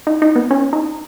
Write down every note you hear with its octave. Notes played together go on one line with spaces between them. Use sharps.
D#4
D#4
B3
C#4
D#4